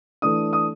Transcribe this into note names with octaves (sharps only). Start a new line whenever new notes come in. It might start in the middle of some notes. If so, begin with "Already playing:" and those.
E3 A3 D4 D#6
D#6